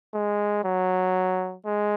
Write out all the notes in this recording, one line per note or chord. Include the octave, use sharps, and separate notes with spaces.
G#3
F#3
G#3